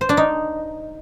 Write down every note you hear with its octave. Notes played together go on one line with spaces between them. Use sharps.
C5
D4
D#4